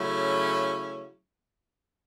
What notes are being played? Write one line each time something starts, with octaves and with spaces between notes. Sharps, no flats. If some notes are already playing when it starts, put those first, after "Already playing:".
Already playing: C#3 F#3 A3 C#4 E4